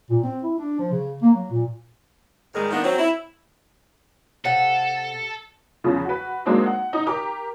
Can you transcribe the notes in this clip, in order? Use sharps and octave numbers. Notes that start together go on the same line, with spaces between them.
A#2
C4
E4
D4
F3
C#3
A#3
F#3
A#2
G#2 D#3 G3 G#3 A#4
D#3 A#3 B3 D4 D#4
F#3 C4
E4
C3 A4 F5 F#5
E2 C#3 F3
F#4 B4
F#3 G#3 A#3 C4 D4 D#4
F#5
D#4
G4 A#4 D6